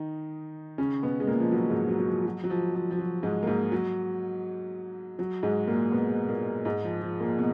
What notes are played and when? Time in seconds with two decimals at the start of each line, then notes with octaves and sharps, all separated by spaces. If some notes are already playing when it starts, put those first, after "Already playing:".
Already playing: D#3 D#4
0.78 C#3 C#4
1.03 B2 B3
1.20 G#3
1.27 A#2 A#3
1.40 F3
1.51 F#3
1.70 G#2 G#3
1.88 F#3
1.99 F#3
2.07 F3
2.25 F#3
2.44 F#3
2.50 F3
2.74 F3
2.91 F3
2.99 F#3
3.23 G#2 G#3
3.43 A#3
3.47 G#2 G#3
3.72 F#3
5.19 F#3
5.43 G#2 G#3
5.67 A#2 A#3
5.92 B2 B3
6.28 A#2 A#3
6.65 G#2 G#3
6.84 F3
7.02 F3
7.20 A#2 A#3
7.38 B2